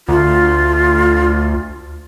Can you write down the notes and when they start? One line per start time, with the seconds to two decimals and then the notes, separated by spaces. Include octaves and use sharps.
0.08 D2 F4